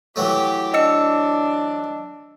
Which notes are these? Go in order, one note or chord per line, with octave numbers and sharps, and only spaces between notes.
E3 F#3 A3 G4
D4 D#5 E6 C#7